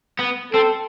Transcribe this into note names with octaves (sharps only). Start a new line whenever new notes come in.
B3
C4 A4